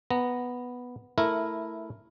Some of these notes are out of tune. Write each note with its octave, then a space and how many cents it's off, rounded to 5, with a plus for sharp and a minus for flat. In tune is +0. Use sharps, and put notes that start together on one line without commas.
B3 +0 A#5 +0
A3 +5 E4 -5 A#4 +0